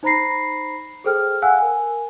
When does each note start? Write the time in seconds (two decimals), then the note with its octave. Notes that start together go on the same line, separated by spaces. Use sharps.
0.03 D#4 C5 A#5 B5 A#6 C7
1.04 G#4 A4 C5 G5 F6
1.42 F5 F#5 G#5 E6 F#6
1.59 A#4 G#5